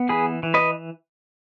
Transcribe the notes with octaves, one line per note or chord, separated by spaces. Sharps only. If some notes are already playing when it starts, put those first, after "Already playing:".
Already playing: B3
E3 G#4 B4
E3
B4 D#5